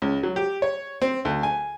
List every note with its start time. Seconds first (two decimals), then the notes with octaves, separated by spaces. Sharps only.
0.02 C#2
0.23 F#3
0.36 G4
0.62 C#5
1.02 C4
1.25 D2
1.43 G#5